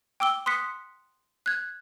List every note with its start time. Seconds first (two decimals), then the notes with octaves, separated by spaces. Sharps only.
0.20 G5 D6 E6 G7
0.46 C6 D#6 F#6 B6 C#7
1.46 F#6 G#6